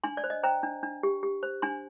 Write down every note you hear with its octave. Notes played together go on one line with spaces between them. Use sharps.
D4 G#5 C6
D5
C5
D#5
C5 G5 A#5
D4
D4
G4
G4
C5
D4 G#5 C6